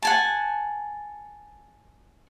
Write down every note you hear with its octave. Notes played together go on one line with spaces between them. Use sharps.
F#5 G#5 A5